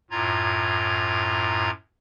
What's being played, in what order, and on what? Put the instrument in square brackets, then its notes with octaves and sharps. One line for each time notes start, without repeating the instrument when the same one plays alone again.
[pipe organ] F#2 A2 F4 A#5 G#6